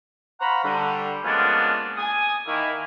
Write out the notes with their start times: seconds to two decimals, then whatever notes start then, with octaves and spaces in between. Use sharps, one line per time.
0.40 C5 F5 F#5 A#5 B5 C#6
0.63 D3 G3
1.24 F3 G#3 A#3 B3 C#4 D4
1.97 G#5 D#6
2.47 D#3 A#3 E4